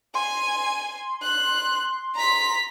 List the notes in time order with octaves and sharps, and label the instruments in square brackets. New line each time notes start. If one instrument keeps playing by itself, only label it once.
[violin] G#5 [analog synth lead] C6
[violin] F#6
A#5 B6